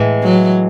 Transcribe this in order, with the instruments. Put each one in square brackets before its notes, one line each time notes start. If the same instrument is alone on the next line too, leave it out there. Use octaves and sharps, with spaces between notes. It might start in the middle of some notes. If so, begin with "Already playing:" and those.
Already playing: [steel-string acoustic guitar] A2 E3 G#3
[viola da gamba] F#3